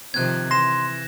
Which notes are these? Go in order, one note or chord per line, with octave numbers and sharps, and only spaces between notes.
C3 D#3 F3 F#6 G#6
E3 C6 A#6 E7